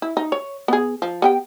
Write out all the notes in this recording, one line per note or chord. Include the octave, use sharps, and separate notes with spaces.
E4
D#4
C#5
B3 G#4
F3
B3 G4 G5